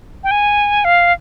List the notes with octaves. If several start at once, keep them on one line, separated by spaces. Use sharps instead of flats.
G5
G#5
F5